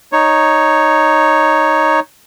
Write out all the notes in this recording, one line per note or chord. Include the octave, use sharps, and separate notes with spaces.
D#4 C#5